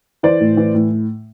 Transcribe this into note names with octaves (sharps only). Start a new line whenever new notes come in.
E3 C5 D5
A2
E3
A2